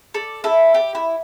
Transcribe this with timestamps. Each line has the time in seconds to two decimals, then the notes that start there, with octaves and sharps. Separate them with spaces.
0.14 A4 D5
0.44 E4 A4
0.74 G4
0.95 E4